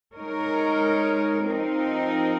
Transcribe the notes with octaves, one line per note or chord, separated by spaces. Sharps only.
G#3 D#4 A#4 C#5
F3 C4 D#4 A#4